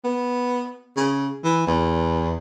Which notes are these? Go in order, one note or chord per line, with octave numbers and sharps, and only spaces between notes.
B3
C#3
E3
E2